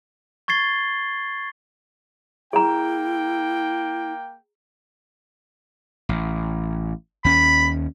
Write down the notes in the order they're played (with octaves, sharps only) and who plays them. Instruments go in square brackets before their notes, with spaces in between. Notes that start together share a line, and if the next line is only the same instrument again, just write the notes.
[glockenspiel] C#6 G#6 A6 C7 G7
[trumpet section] A#3 G5 [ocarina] E4 [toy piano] G#4 A#5
[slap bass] A1
[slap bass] D#2 C#4 [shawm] B5